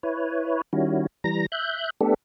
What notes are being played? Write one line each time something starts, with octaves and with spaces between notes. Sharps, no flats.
E4 B4 C#5
D#3 G3 C#4 E4 F#4
E3 G3 A#5 A#6
E5 F#6 G6
A3 B3 D4 G4 A4